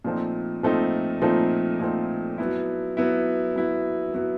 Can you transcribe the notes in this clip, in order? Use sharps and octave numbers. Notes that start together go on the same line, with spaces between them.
A#2 F3 A3 C4 D#4
A#2 F3 A3 C4 D#4
A#2 F3 A3 C4 D#4
A#2 F3 A3 C4 D#4
F#3 B3 E4
F#3 B3 E4
F#3 B3 E4
F#3 B3 E4